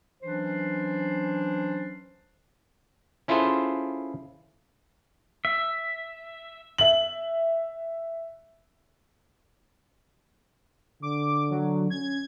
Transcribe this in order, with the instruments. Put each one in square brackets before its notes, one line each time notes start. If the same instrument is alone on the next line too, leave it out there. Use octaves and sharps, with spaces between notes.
[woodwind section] E3 F#3 C#4 D4 C5
[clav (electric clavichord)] C#4 E4 F4 G#4 A4 C5
[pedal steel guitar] E5
[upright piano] E5 F#7
[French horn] D3 [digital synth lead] D6
[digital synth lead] F#3
[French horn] C#4 [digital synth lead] G#6